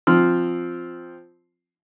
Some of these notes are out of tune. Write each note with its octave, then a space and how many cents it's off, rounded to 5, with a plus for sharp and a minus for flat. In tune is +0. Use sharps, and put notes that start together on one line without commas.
F3 +0 C4 +0